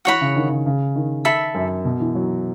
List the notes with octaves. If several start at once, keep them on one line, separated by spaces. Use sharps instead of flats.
E3 F#4 C#5 F#5 B5
C#3
D#3
C#3
C#3
D#3
A4 E5 B5
F#2
B2
E3
F#3